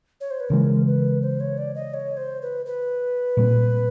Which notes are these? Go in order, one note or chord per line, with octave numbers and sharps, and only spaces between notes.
C#5
C5
B4
C#3 E3 G#3 A#4
B4
C5
C#5
D5
D#5
C#5
C5
B4
B4
A#2 G3 C4